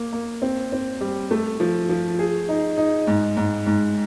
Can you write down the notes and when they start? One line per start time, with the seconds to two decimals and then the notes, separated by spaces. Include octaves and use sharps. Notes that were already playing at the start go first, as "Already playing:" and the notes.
Already playing: A#3
0.13 A#3
0.42 C4
0.72 C4
1.01 G3
1.31 A3
1.60 F3
1.89 F3
2.19 G#4
2.49 D#4
2.77 D#4
3.07 G#2
3.37 G#2
3.66 G#2